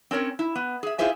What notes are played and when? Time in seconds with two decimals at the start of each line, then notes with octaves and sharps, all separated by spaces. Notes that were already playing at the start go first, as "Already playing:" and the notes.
0.11 C4 C#4 A#4 C#5
0.39 E4
0.55 B3
0.83 G#4 E5
0.98 E4 F4 G#4 C5 E5 G#5